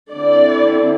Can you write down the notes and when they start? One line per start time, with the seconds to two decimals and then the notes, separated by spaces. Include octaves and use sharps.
0.12 D3 C4 E4 D5